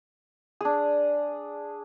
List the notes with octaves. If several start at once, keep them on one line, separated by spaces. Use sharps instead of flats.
D4 G#4